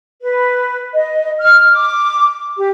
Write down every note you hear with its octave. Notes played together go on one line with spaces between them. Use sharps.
B4
D#5
F6
D6
G4